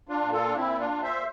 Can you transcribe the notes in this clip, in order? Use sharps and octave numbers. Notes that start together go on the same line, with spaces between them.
D4 F4
A#2
F4 A4
D4
A#2 C4 E4
D4 F4
A#2
C5 E5